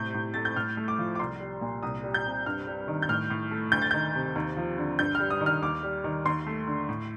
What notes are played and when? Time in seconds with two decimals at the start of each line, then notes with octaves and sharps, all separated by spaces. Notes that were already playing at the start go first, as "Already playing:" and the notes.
Already playing: A2 C3 G6
0.14 A2
0.34 A3 A6
0.45 G6
0.56 A2 F6
0.77 A3
0.88 D6
0.99 F3
1.15 D6
1.19 C2 C6
1.40 G3
1.61 A#2
1.83 C2 D#6
2.04 G3
2.14 G6
2.25 C3
2.46 G2 F6
2.67 G3
2.88 D#3
3.02 G6
3.09 A2 F6
3.30 A2
3.51 A3
3.72 D2 G6
3.82 A6
3.91 D#3 G6
4.15 C3
4.35 D#2
4.57 F3
4.78 D3
4.99 G2 G6
5.15 F6
5.20 G3
5.30 D#6
5.41 D#3
5.46 F6
5.62 D#2 D6
5.83 G3
6.04 D#3
6.25 D#2 C6
6.46 A3
6.67 D3
6.89 A2